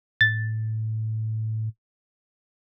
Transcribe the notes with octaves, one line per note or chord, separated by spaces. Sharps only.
A2 A6